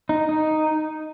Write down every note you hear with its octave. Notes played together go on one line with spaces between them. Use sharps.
D#4
D#4